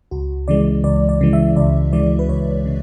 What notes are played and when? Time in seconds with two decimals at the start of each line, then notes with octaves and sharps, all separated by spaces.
0.11 C#2 F#4
0.48 C#3 E3 G#3 D5
0.84 C#2 D5
1.09 D5
1.21 C#3 E3 G#3
1.33 E5
1.56 C#2 D5
1.93 C#3 E3 G#3 D5
2.19 B4
2.29 C#2 C#5
2.66 C#3